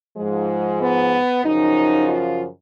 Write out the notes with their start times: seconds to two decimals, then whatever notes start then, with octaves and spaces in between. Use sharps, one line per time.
0.17 G#2 F3 G#3
0.81 B3
1.45 F#2 C#3 F3 D#4
2.09 F4